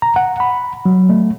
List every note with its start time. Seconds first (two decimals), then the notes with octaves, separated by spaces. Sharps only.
0.02 A#5
0.16 F#5
0.40 B5
0.86 F#3
1.09 A3